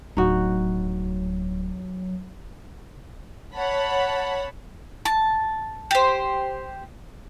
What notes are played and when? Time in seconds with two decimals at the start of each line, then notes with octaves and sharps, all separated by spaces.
0.17 D1 F#3 D#4 F#4
3.52 C#5 F#5 A5 B5
5.05 A5
5.91 G4 C5